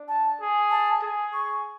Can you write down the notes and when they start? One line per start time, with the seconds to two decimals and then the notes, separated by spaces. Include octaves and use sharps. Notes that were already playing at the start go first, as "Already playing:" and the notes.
Already playing: D4
0.08 A5
0.40 G#4
0.71 A5
1.02 G#4
1.33 C#6